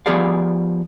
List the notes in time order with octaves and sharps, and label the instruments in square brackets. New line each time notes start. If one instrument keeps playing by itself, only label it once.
[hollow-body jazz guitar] F3 B3 G4 G#4 D5 F5